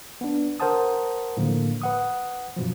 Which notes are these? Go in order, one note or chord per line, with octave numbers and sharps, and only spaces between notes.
B3 D4
A#4 C5 F#5 A5 D#6
A2 D3 F3 A#3
B4 F#5 D#6
F#2 B2 F3